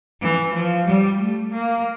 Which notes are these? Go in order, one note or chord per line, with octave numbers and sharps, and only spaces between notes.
E3
F3
G3
A3
A#3